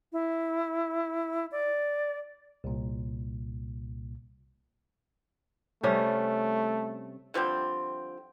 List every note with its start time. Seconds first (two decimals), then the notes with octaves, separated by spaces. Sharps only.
0.13 E4
1.52 D5
2.64 C2 A#2
5.83 C3 G3 A3 C#4
7.34 D3 F3 G3 C4